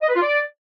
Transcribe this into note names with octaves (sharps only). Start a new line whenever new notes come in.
D#5
B4
F4
D5